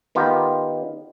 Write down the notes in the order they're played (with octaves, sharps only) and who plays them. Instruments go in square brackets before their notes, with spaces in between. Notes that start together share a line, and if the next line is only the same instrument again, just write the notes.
[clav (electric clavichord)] D#3 B3 F4 G4 A#4